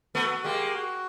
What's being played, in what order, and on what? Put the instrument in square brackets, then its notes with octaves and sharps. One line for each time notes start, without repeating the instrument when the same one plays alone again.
[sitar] A3 B3 [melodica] F#4
[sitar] G#3 A#3 [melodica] G4
[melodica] F#4